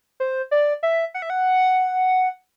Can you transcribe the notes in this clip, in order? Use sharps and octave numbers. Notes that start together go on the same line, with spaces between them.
C5
D5
E5
F#5
E5
F#5